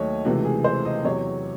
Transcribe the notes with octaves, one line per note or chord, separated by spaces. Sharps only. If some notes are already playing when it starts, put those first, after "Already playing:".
Already playing: D#2 D#3 F#3 A3 C#5 D#5
C#2 C3 E3 A3 F#4
G#4
C5
D#5
E2 C3 F#3 C#5